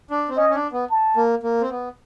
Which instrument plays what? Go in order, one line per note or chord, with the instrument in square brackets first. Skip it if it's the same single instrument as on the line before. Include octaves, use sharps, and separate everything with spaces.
[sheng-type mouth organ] D4
C4
[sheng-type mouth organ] C#4 [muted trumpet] D#5
[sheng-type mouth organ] C#4
D4
B3
[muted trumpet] A5
[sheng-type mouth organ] A#3
A#3
C4
B3